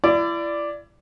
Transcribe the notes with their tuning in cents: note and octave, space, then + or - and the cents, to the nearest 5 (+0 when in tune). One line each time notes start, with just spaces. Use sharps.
E4 +35 D5 +0